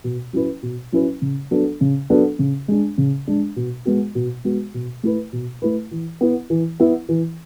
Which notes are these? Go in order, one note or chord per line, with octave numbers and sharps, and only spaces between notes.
B2
F#3 C#4 E4 B4
B2
F#3 C#4 E4 B4
C#3
F#3 B3 D4 A4
C#3
F#3 B3 D4 A4
C#3
G#3 D4
C#3
G#3 D4
B2
G#3 B3 F#4
B2
G#3 B3 F#4
B2
A3 E4 B4
B2
A3 E4 B4
E3
B3 E4
E3
B3 E4
E3